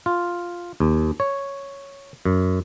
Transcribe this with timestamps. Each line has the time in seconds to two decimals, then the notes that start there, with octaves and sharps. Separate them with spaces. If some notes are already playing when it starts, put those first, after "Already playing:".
0.06 F4
0.80 D#2
1.20 C#5
2.25 F#2